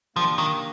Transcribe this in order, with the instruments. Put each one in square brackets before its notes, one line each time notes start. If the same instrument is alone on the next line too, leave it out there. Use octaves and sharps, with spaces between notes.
[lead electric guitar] F3 [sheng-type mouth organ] A#3 D4 G4 A#4
[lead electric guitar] D#3